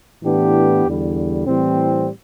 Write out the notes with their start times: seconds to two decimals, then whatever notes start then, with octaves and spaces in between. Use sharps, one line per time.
0.22 A2 E3 B3 D4 G4
0.85 E2 D3 G3
1.46 A2 E3 G3 C4